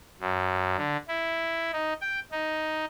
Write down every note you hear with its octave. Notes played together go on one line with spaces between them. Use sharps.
F#2
D3
E4
D#4
G5
D#4